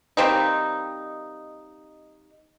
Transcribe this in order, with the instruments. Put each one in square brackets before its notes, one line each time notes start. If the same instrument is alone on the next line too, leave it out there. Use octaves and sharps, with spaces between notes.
[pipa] G3 A#3 C4 D#4